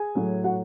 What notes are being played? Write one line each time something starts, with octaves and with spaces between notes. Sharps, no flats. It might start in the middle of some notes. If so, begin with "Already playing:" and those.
Already playing: G#4 G#5
A2 F#3
F#4 F#5